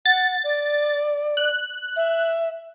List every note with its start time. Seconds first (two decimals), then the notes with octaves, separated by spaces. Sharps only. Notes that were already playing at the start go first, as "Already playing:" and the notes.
0.06 F#5 A6
0.44 D5
1.37 F#6
1.96 E5